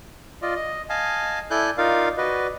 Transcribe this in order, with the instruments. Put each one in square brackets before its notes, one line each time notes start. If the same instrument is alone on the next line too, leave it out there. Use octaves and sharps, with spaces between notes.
[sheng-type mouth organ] F4 D5 D#5
D#5
D#5 F5 G#5 A5
E4 A4 D5 G#5 F#6 G6
D#4 F4 A#4 D5 F5
F#4 B4 D5 D#5